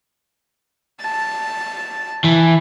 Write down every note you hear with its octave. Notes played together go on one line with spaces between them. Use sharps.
A5
E3